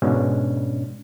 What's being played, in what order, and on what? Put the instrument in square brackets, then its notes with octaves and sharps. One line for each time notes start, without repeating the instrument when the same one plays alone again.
[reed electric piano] G#2 B2 C#4 D4